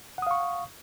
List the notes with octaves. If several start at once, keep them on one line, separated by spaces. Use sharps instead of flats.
F5 F#5 C#6 D#6